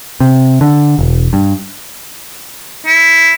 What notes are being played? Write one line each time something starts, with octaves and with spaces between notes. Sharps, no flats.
C3
D3
E1
G2
E4